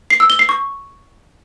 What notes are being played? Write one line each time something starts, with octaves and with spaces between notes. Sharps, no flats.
C7
E6
G7
C7
C#6